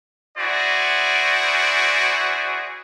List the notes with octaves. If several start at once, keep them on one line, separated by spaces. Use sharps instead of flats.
E4 F#4 G#4 C5 D5